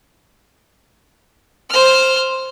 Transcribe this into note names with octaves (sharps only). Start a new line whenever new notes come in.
C5 F6